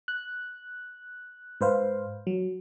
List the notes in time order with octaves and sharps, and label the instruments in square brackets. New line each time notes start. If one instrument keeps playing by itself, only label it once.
[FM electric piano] F#6
G#2 B4 C5 F5
F#3